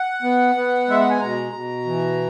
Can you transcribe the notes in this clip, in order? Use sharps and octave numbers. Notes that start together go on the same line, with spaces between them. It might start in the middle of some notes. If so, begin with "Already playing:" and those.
Already playing: F#5
B3
B3
G#3 E5
F#5
G#5
B2 A#5
B2
E3